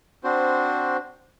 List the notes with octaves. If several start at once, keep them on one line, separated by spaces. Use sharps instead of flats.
C4 D4 F#4 C5